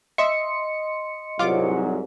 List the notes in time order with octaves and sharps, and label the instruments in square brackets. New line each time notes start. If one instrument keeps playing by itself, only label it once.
[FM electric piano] D#5 C6 C#7 [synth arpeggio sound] E5
[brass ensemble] C2 G#2 F#3 [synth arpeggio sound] F4 D6